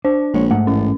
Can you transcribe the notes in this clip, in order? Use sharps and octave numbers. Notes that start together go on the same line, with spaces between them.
D4 C5
A#1 G#3 C#5
G#2 A3 F#5
A1 C#4